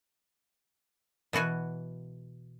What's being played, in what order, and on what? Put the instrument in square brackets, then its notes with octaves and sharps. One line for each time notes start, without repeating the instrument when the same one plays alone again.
[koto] B2 E3 F#4 G#5